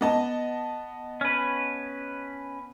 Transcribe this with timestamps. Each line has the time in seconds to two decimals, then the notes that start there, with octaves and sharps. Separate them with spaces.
0.01 B3 D#5 A5
1.21 C#4 B4